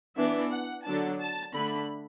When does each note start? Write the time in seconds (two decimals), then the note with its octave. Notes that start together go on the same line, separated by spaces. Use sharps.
0.17 E3 B3 D4 E5
0.51 F#5
0.85 D3 F#3 D4 A5
1.20 A5
1.54 D3 A3 D4 B5